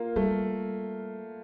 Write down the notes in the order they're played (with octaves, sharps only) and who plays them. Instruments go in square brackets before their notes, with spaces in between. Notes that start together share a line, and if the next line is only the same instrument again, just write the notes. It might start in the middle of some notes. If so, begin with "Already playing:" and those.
Already playing: [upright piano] A#3 F4
[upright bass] G3 [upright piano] A3